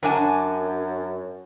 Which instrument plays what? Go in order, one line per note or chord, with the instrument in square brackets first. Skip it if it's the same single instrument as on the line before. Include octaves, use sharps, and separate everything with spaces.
[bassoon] F#2 [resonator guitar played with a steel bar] F#3 D4 G#5